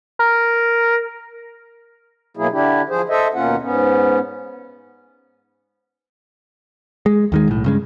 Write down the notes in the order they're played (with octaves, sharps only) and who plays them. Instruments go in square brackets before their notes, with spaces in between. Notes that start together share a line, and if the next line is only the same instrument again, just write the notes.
[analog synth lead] A#4
[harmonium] B2 F#3 A#3 E4 G#4
D3 D4 E4 G4
F3 G#4 C5
A4 C5 D#5 E5
D#2 B2 A#3 C#4 F4 F#5
G#2 B3 C#4
[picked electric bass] G#3
D#2 D#3 G#3
B1 A2
G2 C#3 G#3